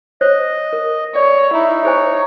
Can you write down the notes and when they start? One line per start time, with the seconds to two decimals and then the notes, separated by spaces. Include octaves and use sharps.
0.21 C5 C#5 D#5
0.73 A#4
1.15 C#5 D5
1.53 D#4 E4
1.85 G#4 C5 C#5 G#5